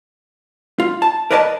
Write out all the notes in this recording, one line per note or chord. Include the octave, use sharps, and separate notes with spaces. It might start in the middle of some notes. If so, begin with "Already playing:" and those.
F4
A5
A#4 B4 D5 D#5 G5 A5